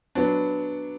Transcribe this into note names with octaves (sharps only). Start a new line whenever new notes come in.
F#3 B3 D4